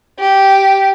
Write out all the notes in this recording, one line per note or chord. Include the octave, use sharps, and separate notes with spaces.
G4